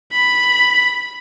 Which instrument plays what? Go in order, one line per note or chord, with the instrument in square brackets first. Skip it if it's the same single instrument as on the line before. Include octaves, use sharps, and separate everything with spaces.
[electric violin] B5